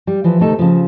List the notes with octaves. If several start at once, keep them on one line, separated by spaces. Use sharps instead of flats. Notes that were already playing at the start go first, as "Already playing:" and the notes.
G3
E3 F3
D2 C3 A3 D#4 A4
C#3 F3